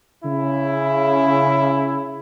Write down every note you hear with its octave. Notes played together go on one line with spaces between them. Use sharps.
C#3 E4